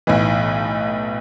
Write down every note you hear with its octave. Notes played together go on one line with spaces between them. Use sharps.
B1 A2 E3 D#4